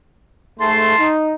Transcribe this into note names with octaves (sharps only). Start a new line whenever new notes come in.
G#2 G#3 A3 A5 C6
D#4